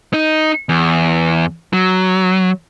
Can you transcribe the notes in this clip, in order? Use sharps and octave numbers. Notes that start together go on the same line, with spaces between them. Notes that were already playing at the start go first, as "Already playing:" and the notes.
D#4
E2
F#3